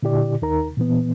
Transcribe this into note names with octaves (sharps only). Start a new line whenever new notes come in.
A#2 D3 E4 G4 D5
D#2 D#4 A#4 A#5
A#2 E3 B3